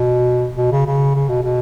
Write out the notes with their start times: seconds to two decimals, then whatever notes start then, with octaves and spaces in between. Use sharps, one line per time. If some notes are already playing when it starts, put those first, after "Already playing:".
Already playing: B2
0.56 B2
0.72 C#3
0.86 C#3
1.15 C#3
1.29 B2
1.43 B2